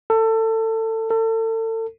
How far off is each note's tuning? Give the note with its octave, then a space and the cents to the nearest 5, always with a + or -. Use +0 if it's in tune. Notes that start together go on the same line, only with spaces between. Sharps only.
A4 +25
A4 +35